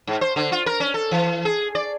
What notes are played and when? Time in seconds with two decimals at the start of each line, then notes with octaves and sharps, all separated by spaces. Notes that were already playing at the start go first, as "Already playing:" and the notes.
0.07 G#2
0.21 C5
0.36 D3
0.52 F4
0.66 A#4
0.80 C#4
0.94 A4
1.11 E3
1.45 G#4
1.75 D5